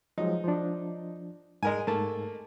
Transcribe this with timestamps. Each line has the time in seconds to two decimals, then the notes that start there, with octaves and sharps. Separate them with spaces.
0.18 F3 F#3 G#3 D#4
0.44 F3 D4
1.63 G#2 G#3 A#4 G#5
1.87 G#2 A3 A#3 A5